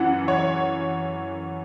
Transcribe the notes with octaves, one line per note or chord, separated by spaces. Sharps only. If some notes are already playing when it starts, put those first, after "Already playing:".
Already playing: F#2 E3 F#5
C#5